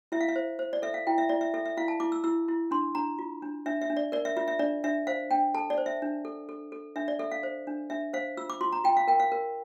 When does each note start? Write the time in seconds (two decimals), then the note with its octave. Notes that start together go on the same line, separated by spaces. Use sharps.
0.12 E4 E5
0.21 F5
0.28 E5
0.36 C5
0.59 C5
0.73 D5
0.82 A4 E5
0.94 F5
1.07 E4 G5
1.18 E5
1.29 E4 D5
1.41 E5
1.54 A4 E5
1.66 E5
1.77 E4 F5
1.88 A5
2.00 E4 D6
2.12 E6
2.24 E4 E6
2.48 E4
2.71 D4 C6
2.95 D4 A#5
3.19 F4
3.42 D4
3.66 D4 E5
3.81 E5
3.90 D4
3.97 D5
4.12 A#4 D5
4.25 E5
4.37 F4 E5
4.48 E5
4.59 D4 D5
4.84 D4 E5
5.07 C5 F5
5.31 D4 G5
5.54 A4 A5
5.70 D5
5.78 C5
5.86 E5
6.02 D4
6.25 A4
6.49 A4
6.72 A4
6.96 D4 E5
7.08 D5
7.19 A4 E5
7.31 F5
7.43 C5
7.67 D4
7.90 D4 E5
8.13 C5 F5
8.37 F4 E6
8.50 D6
8.61 F4 C6
8.72 A#5
8.84 F4 G5
8.97 F5
9.07 A#4 G5
9.20 F5
9.32 A#4